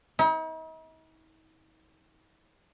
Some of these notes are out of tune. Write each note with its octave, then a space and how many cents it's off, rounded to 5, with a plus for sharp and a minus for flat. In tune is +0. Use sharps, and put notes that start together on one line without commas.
D#4 +45